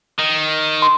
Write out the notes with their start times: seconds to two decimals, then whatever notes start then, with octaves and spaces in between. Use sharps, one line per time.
0.19 D#3
0.82 C6